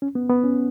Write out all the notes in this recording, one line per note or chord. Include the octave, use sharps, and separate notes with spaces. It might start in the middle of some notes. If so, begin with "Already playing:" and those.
C#4
B3
B3
C#4